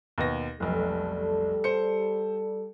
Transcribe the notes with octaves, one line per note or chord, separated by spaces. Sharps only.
D#2 B2 A#6
F1 B1 G3 A4
C5 C#7